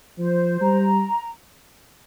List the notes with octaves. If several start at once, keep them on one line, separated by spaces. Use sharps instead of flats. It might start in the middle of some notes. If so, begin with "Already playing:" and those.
F3 C5
G3 A#5